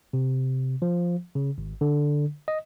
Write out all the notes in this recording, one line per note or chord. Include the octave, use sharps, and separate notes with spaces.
C3
F3
C#3
G#1
D3
D#5